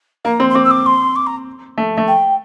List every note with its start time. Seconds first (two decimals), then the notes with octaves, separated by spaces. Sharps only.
0.25 A#3 A#5
0.40 C4 C6
0.50 C6
0.55 C4 D6
0.64 E6
0.71 D6
0.86 C6
1.16 D6
1.26 A#5
1.78 A3
1.98 A3
2.07 G5